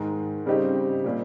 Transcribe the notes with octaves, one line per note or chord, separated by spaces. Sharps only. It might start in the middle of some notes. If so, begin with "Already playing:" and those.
Already playing: G#2 D#3 G#3
C#3 G3 C4 D#4 G4
A#2 G3 A#3